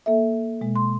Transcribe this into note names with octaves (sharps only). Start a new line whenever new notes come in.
A#3 A4 E5
B2 G#3
C6